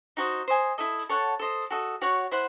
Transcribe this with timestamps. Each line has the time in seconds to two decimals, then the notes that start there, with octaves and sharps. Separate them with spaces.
0.17 D#4 F#4 C5 D#5
0.48 C5 D#5 G#5
0.78 E4 A4 D#5
1.09 A4 C#5 F#5 A5
1.40 A4 C5 D#5
1.70 F#4 A4 D#5
2.02 F#4 C#5 F#5
2.31 E4 C5 F#5